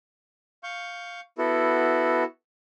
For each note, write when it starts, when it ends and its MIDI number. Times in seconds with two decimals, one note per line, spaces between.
0.63 1.20 77
0.63 1.20 85
0.63 1.20 91
1.38 2.23 59
1.38 2.23 64
1.38 2.23 66
1.38 2.23 69